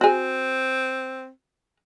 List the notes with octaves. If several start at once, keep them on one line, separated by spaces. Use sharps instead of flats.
C4 F#4 G#4